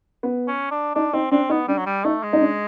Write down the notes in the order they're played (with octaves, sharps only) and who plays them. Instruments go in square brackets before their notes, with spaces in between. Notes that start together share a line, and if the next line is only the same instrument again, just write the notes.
[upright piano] B3
[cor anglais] C#4
D4
[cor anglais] D4 [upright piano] D#4
[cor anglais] C4 [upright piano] D#4
[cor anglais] C4 [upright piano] D4
[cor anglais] B3 [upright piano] D#4
[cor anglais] G3 [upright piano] D4
[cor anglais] F#3
G3
[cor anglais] A3 [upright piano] D#4
[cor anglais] G#3
[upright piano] D#4
D4